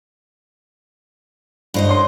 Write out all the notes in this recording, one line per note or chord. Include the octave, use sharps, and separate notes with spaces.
G2 C5 D#5
C#5 C6